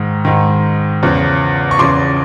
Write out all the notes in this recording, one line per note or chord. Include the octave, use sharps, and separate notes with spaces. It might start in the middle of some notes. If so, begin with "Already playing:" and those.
Already playing: G#2 D#3
G#2 D#3
E2 C#3 F3
C#6
E2 C#3 F3 C6 D6